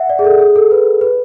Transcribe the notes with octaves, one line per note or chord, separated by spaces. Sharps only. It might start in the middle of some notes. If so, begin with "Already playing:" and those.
Already playing: E5 F#5
D5
G#4
A4
G#4
A4
B4
B4